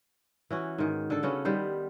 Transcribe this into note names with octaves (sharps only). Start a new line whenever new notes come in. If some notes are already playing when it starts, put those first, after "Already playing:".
E3 C#4 F#4
G#2 D#3
D3 A4
C#3 B3 C#4 F#4
D#3 G3 B3 C5